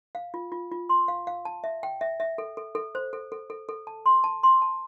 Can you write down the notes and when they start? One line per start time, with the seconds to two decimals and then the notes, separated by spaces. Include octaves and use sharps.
0.15 F5
0.34 F4
0.52 F4
0.72 F4
0.89 C6
1.08 F5
1.27 F5
1.45 A5
1.64 E5
1.83 G5
2.01 E5
2.20 E5
2.38 A4
2.57 A4
2.75 A4
2.95 C5
3.13 A4
3.32 A4
3.50 A4
3.69 A4
3.87 A5
4.06 C6
4.24 A5
4.43 C6
4.62 A5